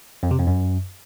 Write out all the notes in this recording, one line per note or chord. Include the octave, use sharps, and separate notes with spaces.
F2
C3
F2
F#2